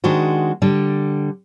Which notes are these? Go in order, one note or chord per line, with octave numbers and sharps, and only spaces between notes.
D#3 G#3 D4 F#4 C5
D3 G3